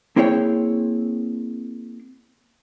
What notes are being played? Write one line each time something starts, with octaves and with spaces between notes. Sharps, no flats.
A#3 C4 E4 G#4 C#5 G5